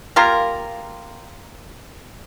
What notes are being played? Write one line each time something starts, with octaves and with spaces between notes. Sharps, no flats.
A#3 F4 G4 A#4